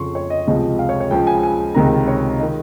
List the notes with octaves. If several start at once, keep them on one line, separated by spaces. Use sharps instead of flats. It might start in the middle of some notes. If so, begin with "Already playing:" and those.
Already playing: F2 C#3 F3 C6 C#6
C#5
D#5
C#2 C3 F3 D#5
F5
C#5
C#5
C#2 C#3 F3 G5
G#5
G#5
C#2 C3 D#3 A#5
C#5
D#3 D#5